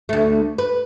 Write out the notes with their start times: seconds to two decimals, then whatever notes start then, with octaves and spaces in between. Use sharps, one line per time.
0.09 D2 A3
0.58 B4